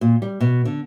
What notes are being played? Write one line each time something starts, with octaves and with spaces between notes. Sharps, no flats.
A#2
G3
B2
D3